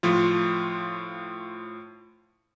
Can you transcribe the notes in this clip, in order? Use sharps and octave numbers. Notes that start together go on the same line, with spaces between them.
A2 F3 F4